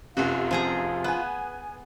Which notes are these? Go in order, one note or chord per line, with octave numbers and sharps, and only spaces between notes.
F1 F#2 C3 F4 F#4
F3 G#4 A#5
B3 G#5 F#6